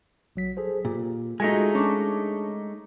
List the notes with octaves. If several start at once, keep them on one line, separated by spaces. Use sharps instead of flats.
A#1 F#3 B6
G#4 A4 C5
A#2 G4
G#3 A3 D#4 F4 F#4 G#5
C#4 D4 A5 C#6 D6